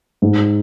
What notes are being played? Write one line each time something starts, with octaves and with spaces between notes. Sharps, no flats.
G#2